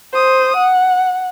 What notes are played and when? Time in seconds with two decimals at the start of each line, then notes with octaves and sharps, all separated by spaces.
0.13 C5 D#6
0.56 F#5